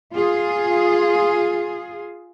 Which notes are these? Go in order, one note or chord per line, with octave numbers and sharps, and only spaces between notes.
F4 G#4